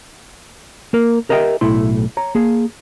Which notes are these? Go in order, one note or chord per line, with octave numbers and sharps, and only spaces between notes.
A#3 A#4
G4 A#4 D#5 E5 F#5 G5
B1 A2 A3 E4 C6
C#5 A#5
A#3 G#4